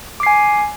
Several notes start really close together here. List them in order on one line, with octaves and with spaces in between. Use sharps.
D6 C7 G#5